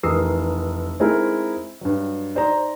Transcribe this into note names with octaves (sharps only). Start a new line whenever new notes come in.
F1 E3 A#4 D#6 E6 C7
G#3 C4 D#4 E4 A#4
G2 F#3
D#4 C5 D5 A#5